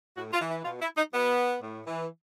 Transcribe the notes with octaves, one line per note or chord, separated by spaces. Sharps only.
A2 F#4
F4
E3
E4
B2 F4
E4
D#4
B2 B3
A2
E3